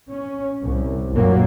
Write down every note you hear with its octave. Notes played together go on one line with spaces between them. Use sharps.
C#4
C2
F#1 G2 A#2 F#3 G3 A#3